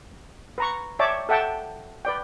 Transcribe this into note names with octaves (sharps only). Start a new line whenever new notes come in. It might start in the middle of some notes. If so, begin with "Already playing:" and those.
B4 A#5 C#6
C#5 D5 E5 G5 A5 D6
A4 E5 F#5 G5 A5
B4 D5 G5